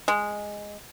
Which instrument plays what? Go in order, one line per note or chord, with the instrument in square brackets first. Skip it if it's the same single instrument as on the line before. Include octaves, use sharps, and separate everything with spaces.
[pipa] G#3